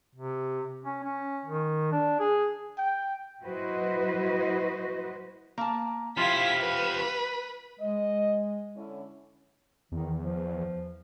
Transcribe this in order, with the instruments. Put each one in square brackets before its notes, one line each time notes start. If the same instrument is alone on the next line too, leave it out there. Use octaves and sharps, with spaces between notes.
[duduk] C3
C#4
C#4
D#3
D4
G#4
[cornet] G5
[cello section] F#3 E4 F#4 B4 C5 D#5
[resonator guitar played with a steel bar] A#3 A5
[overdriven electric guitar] F3 G4 [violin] E4 B6 [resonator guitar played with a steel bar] F4 F5
[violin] B4
[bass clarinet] G#3 [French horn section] D#5
[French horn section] D3 C#4 E4
[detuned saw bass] E2 [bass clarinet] D#3
[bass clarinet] F3